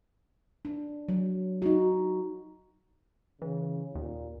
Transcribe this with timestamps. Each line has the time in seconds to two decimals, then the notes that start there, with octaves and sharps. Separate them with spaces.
0.65 D4
1.09 F#3
1.62 D#4 F#4
3.42 C#3 E3
3.95 D#2 A#2